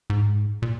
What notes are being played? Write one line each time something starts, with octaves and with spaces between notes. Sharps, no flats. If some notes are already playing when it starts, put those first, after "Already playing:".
G#2
A#2